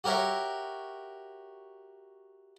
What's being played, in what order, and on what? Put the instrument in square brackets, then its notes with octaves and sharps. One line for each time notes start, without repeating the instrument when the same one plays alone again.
[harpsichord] F#4 G4 A#4 C#5 E5